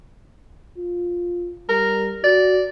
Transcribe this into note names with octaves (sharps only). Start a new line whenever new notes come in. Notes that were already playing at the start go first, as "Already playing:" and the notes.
F4
G3 A#4
F#4 D5